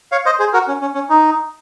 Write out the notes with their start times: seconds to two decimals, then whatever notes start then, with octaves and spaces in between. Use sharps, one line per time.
0.12 C#5 F5
0.26 C5 D#5
0.40 G#4 C5
0.53 F#4 A#4
0.68 C#4
0.81 C#4
0.95 C#4
1.10 D#4